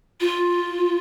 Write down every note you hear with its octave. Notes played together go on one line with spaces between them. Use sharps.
F4